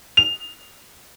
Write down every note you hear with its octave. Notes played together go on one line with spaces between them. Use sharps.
F7